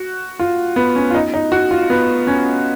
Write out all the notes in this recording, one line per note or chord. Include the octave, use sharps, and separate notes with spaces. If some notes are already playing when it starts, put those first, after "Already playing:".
Already playing: F#4
F4
B3
C#4
F4
D#4
D#4
F#4
F4
B3
C#4